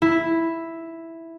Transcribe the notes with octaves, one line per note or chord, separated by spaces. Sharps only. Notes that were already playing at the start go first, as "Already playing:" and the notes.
E4